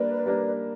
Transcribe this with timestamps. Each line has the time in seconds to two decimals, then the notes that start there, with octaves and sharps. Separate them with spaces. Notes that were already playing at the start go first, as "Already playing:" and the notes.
Already playing: G3 A#3 D4 A#4 B4 D5
0.26 G3 A#3 D4 A#4